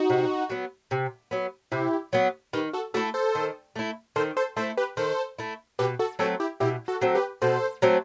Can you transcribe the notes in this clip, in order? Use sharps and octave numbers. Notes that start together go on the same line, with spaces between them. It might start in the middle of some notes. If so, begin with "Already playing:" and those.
Already playing: D#4 F#4
C3
F#3 B3
C3
F#3 B3
C3 E4 G4
F#3 B3
D#3 G4 B4
F#4 A4
A3 E4 F#4 A4
A4 C5
D#3
A3 E4
D#3 A4 C5
A4 C5
A3 E4 A4 C5
G4 B4
D#3 A4 C5
A3 E4
B2 G4 B4
F#4 A4
F#3 A3 C4 F#4 A4
E4 G4
B2 E4 G4
F#4 A4
F#3 A3 C4
G4 B4
B2 A4 C5
F#3 A3 C4